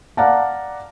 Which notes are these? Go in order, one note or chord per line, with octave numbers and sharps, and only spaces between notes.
D5 F5 F#5 A5 A#5